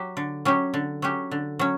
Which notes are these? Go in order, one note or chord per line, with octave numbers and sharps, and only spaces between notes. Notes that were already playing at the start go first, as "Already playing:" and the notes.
Already playing: F#3 G4
D3
F#3 C#4 G4
D3
F#3 C#4 G4
D3
F#3 C#4